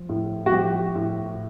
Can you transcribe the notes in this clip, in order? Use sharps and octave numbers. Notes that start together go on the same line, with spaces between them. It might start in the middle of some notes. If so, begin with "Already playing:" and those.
Already playing: F3
A2
F#4
F3 G4
A2